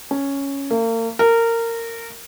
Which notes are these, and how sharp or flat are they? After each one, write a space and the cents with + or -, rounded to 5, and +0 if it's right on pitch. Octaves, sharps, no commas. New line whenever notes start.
C#4 +0
A#3 -40
A#4 -20